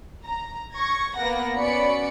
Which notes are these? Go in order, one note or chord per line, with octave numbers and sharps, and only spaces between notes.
A#5
C#6 G#6 A#6
A#3 B3 F#5 A#6
B3 C#4 F#4 D5 B5 C#7